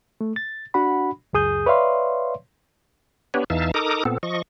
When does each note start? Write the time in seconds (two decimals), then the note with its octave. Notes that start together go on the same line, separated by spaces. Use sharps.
0.21 A3
0.36 A6
0.74 D4 F#4 F#5 B5
1.33 C#2 F#2 G#4 D#6 G6
1.66 B4 C#5 D5 E5 F5 C6
3.34 B3 D4 G4 B4 C#5
3.50 E2 E3 D#4 E5 F5 A5
3.74 D#4 A4 A#4 A#5 D6 D#6
4.05 A#2 B3 C4 A4
4.23 F3 D#5 C#6